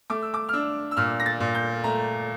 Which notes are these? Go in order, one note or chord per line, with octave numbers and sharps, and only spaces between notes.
A3 D6
E6
D6
F6
D4 E6
E6
A#2 F6
A#6
A6
A#2
G6
A3 A#5